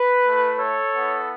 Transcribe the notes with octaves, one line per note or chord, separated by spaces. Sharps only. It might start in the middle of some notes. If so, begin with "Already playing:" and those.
Already playing: B4
A3 E4
A4 C#5
B3 E4